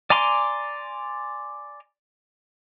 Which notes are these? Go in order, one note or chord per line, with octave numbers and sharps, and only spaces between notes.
D5 G#5 A#5 C6 D6